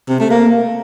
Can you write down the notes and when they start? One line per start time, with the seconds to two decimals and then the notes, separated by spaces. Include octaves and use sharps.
0.09 C3
0.20 A3
0.30 A#3